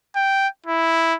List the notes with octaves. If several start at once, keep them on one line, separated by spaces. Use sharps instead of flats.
G5
E4